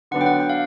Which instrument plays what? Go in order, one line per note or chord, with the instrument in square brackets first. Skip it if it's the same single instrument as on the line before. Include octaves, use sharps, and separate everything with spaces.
[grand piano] D3 F#3 B3 D4 [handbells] F#5
[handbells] G5
F#5
G5
F5